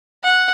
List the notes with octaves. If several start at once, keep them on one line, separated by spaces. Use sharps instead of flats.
F#5